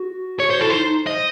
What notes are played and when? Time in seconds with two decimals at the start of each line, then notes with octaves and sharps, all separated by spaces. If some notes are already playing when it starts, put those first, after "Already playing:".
Already playing: F#4
0.39 F#4 C#5
0.50 F#4 C5
0.61 E4 A4
0.70 D#4 C5
0.85 D#4
1.07 C5 D#5